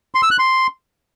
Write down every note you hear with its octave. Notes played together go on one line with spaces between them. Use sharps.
C6
E6
F#6
C6